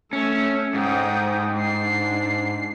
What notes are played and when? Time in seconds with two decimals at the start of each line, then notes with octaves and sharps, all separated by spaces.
0.13 A3 C#4 E5
0.74 G#2 G5 D#6
1.55 D4 C7